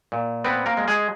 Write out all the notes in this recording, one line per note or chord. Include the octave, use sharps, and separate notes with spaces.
A#2
B3 C4 B4
A#3 A#4
G#3
G#3 G#4